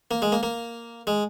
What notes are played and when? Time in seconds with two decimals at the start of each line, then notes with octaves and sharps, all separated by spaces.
0.11 A#3
0.22 G#3
0.32 A#3
0.43 A#3
1.07 G#3